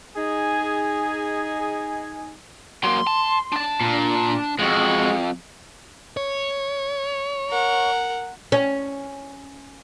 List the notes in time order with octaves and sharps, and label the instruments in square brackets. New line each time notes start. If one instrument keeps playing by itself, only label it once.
[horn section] D#4 G#4 G#5
[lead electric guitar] F#3 A#3 [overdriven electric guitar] C6
[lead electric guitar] A5
D4 A5
[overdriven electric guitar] A#2
[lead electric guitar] F2 [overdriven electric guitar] G#3 F#4
[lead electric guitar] C#5
[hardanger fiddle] A#4 F#5
[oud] C#4